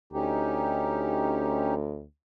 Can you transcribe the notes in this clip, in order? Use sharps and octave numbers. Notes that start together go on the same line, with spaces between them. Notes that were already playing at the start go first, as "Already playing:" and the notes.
D2 C#4 D#4 G4